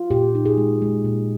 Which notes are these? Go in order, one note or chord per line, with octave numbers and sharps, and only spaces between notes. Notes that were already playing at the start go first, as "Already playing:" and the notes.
Already playing: F4
A#2 G4
D#4
G#4
G#3
G#3
A#2